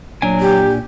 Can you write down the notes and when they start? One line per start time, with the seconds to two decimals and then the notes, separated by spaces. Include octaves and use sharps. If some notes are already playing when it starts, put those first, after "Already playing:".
0.22 A#2 F#3 D4 G#5
0.41 G4